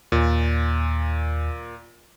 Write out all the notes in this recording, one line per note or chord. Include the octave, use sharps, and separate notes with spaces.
D#2 A#2